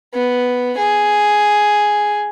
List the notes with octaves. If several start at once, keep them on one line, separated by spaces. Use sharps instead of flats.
B3
G#4